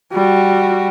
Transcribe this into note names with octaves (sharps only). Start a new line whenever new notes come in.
G3 F#4